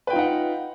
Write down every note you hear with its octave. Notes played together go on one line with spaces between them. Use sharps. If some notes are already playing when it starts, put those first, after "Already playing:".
D#4 F4 B4 F#5 G5